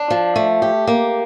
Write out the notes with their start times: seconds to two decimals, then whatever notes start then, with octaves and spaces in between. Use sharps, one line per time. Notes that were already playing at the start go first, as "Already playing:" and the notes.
Already playing: D4
0.10 F3
0.36 A3
0.62 G4
0.87 A#3